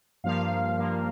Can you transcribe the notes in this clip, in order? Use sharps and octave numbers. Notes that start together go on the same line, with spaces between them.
G2 F3 A#3 F5
G2 F3 A#3